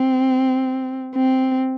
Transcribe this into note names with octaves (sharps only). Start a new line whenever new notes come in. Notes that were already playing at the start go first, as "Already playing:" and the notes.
Already playing: C4
C4